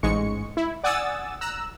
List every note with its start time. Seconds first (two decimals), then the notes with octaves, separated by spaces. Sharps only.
0.03 A1 G#2 G#3 C#6 C#7
0.57 E4
0.84 D5 F#5 G#5 D#6 E6 A6
1.41 A#5 E6 F#6